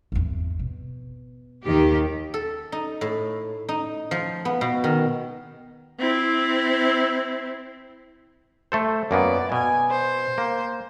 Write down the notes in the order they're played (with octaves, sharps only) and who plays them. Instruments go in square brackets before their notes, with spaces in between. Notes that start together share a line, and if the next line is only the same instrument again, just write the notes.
[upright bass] G#1 E2
B2
[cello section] D#2 D#3 G4
[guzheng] A4
D#4
A2
D#4
F3
B3
B2
D#3
[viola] C4 E4
[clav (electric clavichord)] A3 A4 C5
[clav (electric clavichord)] F#2 A#3 B3 [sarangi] D5
[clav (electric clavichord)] B2 [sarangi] G#5
[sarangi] C5
[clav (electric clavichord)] A#3